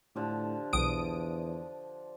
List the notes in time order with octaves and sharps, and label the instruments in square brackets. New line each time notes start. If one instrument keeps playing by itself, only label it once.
[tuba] A2 [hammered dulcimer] D3 F3 G4
[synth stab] B1 D#6 D7 [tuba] E2